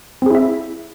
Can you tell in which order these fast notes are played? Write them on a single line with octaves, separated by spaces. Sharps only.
C4 G#4 E4 E5